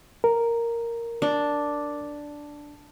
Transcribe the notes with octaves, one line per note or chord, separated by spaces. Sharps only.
A#4
D4